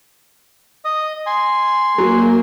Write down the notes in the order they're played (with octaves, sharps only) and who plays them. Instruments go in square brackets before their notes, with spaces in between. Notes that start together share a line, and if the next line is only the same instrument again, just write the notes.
[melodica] D#5 D#6
G#5 C6
[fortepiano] F#3 [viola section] A#3